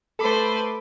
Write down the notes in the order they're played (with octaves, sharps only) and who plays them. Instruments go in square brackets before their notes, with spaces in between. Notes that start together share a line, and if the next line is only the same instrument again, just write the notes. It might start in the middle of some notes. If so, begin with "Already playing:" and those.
[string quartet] A3 B4 C5 [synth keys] A4 B5 D6